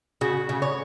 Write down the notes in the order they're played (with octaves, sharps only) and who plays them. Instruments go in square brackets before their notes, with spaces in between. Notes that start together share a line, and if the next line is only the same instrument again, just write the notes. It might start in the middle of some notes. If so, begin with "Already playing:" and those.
[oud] C#3 [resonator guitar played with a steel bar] F#4
[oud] C#3
[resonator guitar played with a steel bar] C#5